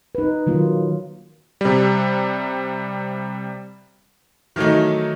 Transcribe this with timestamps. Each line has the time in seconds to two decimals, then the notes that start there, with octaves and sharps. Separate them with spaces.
0.15 D#4 B4
0.47 D#3 F#3 A#3 F4
1.61 C3 G3
4.56 D#3 E3 F#3 A3 D#4